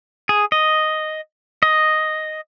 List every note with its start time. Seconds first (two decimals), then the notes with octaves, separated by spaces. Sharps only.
0.29 G#4
0.52 D#5
1.63 D#5